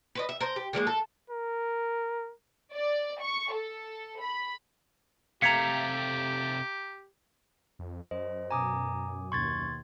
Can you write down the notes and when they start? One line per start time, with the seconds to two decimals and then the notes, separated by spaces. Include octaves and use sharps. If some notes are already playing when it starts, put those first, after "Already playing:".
0.15 B4 C5 D#5
0.29 E5
0.40 A#4 C5
0.56 G4
0.73 D3 F3 G#3 A#3
0.87 A4
1.30 A#4
2.73 D5
3.20 C#6
3.53 A4
4.21 B5
5.42 C3 A3 G4 F5 A#5 G#6 B6 C#7
7.79 F2
8.11 F#2 C5 D#5
8.51 B2 G#5 A#5 D6 D#6
9.32 D#2 B2 C6 C#6 G#6 A6